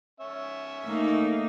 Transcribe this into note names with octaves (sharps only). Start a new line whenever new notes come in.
C#4 E5
A3 A#3 D#4